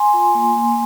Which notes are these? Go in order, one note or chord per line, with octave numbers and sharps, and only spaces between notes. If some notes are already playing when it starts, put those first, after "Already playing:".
Already playing: G#5 C6
F4
A#3
A#3